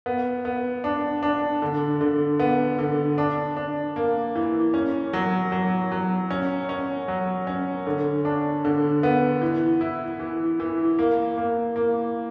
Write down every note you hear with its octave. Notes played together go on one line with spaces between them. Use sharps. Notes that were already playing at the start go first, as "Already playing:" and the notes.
B3
B3
D4
D4
D3
D3
B3
D3
D4
D4
A#3
E3
C#4
F#3
F#3
F#3
C#4
C#4
F#3
C#4
D3
D4
D3
B3
E3
E4
E3
E3
A#3
A#3
A#3